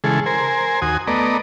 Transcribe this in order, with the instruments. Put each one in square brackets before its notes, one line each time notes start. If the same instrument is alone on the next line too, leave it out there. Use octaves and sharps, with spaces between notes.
[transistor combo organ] C#3 E3 G#3 G#4 A4
A#4 C5 G#5
D#2 F#4 G#5 D#6
A3 B3 D5 D#5 A#5